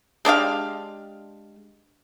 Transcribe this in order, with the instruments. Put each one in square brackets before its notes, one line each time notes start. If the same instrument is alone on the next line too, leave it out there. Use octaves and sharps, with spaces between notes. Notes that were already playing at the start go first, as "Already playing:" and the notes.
[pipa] G#3 D4 G4 F5